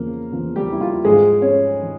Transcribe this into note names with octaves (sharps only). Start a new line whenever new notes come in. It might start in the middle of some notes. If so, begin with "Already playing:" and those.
Already playing: E2 C#3 F3 A#3
E2 C#3 F3
G3 G4
E4
F4
G#2 F3 G#3 G#4
C#4 C#5
F3